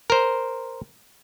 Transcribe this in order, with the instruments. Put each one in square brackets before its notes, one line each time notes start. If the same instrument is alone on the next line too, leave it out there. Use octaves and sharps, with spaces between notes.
[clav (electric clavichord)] A#4 C5